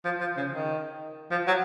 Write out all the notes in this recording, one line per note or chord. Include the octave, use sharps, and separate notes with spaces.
F3
F3
C#3
D#3
F3
F#3